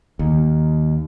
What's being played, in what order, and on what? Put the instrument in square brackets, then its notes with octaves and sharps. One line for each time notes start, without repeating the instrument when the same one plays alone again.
[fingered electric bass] D#2